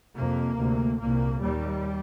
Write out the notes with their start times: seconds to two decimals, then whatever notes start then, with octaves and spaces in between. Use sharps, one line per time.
0.14 F2 C3 A#3
0.56 D2 C3
0.99 C2 A#2 A#3
1.40 D#2 G3